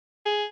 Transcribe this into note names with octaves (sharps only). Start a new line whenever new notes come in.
G#4